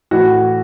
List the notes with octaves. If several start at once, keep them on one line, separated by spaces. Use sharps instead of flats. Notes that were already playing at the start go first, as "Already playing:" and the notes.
A2 E3 F#4